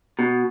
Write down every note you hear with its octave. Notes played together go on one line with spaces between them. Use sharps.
B2